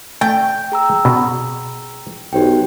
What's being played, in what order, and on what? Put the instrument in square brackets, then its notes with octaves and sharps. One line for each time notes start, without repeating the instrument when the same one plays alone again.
[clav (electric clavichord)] A3 [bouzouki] G5
[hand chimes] G#4 A#5 E6
[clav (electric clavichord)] B2
[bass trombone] B1 [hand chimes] G4 C5 G5